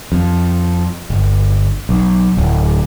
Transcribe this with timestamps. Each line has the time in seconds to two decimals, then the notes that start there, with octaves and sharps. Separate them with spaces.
0.12 F2
1.10 G1
1.89 B1
2.37 D1